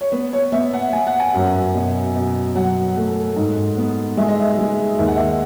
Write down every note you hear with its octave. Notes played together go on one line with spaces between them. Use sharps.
C#5
B3 B4
C#5
B3 E5
F#5
B3 G#5
F#5
G#5
F#2
B2
B2
F#3 F#5
A3
G#2
B3
G#3 E5
D#5
E5
G#3
D#2 E5
F#5
E5